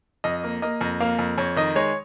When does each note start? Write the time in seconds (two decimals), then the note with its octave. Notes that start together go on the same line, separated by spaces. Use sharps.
0.24 F2 D#5
0.44 A#3
0.62 A#3 D#5
0.81 F2
1.00 A#3 F5
1.19 F2
1.38 F2 C#5
1.56 D#3 D#5
1.75 G#3 C#5